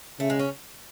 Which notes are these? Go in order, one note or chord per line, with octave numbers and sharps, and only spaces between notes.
C#3 A3
G#3
C#4